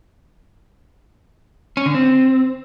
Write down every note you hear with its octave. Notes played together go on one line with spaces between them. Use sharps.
C#4
D3
C4